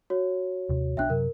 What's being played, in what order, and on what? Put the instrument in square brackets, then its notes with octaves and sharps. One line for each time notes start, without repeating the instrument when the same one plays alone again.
[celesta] F#4 C#5
[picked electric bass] D#2 C3
[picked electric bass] B1 B2 D4 [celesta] E5 G5 F#6
[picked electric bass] F#2 C3 F#3 [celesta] A#4